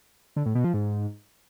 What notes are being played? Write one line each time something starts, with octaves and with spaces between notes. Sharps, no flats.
D3
A2
B2
F3
G#2